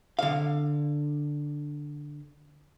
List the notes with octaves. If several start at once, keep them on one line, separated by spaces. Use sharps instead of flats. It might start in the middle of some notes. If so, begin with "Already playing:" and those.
D3 F5